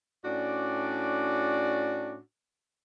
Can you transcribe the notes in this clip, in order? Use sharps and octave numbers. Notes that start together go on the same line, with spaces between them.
A2 C#4 D4 F#4 D5